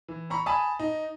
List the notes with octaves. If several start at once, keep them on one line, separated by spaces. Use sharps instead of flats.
E3
A#5 B5 C#6
G#5 A5 B5 D#6
D#4